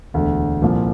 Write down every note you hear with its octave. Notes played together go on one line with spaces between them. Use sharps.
E1 D2 D3
C2 A#2 F3